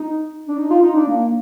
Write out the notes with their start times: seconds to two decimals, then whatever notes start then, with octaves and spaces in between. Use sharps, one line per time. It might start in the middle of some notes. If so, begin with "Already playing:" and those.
Already playing: D#4
0.49 D4
0.57 D#4
0.70 F4
0.83 D#4
0.95 D4
1.08 A#3